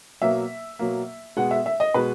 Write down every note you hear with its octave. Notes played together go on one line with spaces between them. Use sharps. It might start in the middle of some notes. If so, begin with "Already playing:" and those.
B2 F#3 A#3 E5
B2 F#3 A#3
B2 G#3 B3 F#5
E5
E5
D#5
B2 G#3 B3 B4